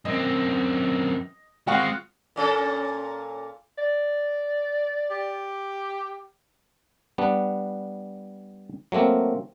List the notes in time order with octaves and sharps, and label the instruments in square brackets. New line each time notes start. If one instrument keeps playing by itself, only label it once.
[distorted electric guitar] F#2 C4 [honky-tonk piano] D#5
[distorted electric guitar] G#3 C4 [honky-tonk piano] F4 F#5 C#6
[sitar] A#2 C#4 A4
[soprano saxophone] D5
[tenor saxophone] G4
[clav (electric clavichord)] G3 B3 D4
F#3 A3 A#3 C4